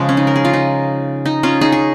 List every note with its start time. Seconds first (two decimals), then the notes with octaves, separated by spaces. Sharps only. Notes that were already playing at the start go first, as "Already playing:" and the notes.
Already playing: C#3 F3 G#3
0.09 C#4
0.17 D#4
0.27 A#4
0.36 G#4
0.45 F4
0.53 D#4
1.25 D#4
1.43 C#4 F4
1.61 D#4 G#4
1.72 G#4